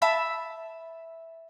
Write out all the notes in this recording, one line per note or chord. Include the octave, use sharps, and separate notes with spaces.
E5 A5 B5